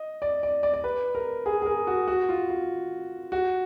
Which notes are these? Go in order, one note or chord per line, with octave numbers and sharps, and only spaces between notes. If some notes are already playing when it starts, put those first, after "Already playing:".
Already playing: D#5
D5
D5
D5
D5
B4
A#4
G#4
G#4
A#4
F#4
F#4
F4
F4
F#4